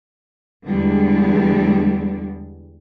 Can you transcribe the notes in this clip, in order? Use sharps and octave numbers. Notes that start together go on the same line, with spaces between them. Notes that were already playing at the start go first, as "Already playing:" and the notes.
E2 D3 G3 G#3